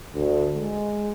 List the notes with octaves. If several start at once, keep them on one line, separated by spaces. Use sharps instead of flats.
D2
G#3